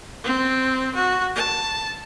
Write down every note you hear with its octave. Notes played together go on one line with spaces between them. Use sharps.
C4
F#4
A5